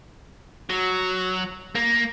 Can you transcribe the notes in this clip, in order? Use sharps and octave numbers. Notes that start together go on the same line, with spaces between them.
F#3
A#3